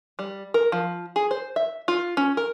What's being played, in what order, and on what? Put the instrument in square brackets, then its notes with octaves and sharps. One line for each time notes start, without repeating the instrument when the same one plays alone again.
[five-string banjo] G3
A#4
F3
G#4
C5
E5
F4
C#4
A#4